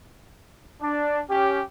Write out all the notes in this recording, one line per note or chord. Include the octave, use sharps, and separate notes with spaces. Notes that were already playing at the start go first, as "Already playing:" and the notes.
D4
C#4 G4